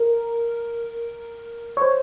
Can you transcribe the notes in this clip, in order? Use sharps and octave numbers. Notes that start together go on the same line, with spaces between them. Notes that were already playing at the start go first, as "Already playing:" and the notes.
Already playing: A#4
C#5
C5